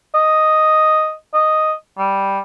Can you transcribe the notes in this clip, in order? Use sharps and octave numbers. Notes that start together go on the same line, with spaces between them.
D#5
D#5
G3